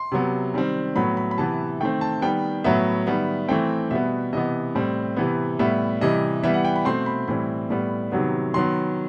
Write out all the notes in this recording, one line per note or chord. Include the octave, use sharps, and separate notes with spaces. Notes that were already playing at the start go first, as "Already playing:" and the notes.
Already playing: C6
C3 F#3 B3
D#3 G3 C4
A2 F#3 B3 B5
B5
B5
C3 E3 B3 A5
D#3 A3 C4 G5
A5
D#3 G3 B3 G5
A2 F#3 B3 E5
D#3 G3 B3
E3 A3 C4 G5
B2 G3 B3 E5
C3 E3 B3 D#5
A2 G3 C4
C3 E3 B3
A2 G3 B3 E5
C3 E3 G3 D#5
E3 G3 B3 E5
F#5
G5
B5
B2 A3 C4 C6
B5
A2 E3 G3 C4 B5
A2 G3 B3
C3 D#3 F#3 B3
D#3 F#3 B3 C6